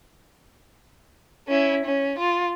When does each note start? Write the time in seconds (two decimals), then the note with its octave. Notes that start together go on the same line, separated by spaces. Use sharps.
1.48 C#4 E4
1.85 C#4
2.18 F4